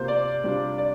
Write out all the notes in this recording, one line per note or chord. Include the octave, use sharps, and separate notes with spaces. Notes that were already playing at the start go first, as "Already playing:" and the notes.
Already playing: C3 A#3 F4 C5
D5
C3 G3 D4 F4
D5